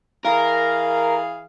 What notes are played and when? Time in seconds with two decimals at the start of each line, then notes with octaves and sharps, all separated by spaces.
0.25 E3 G#4 A#4 F5